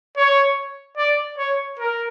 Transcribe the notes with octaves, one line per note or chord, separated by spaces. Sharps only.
C#5
D5
C#5
A#4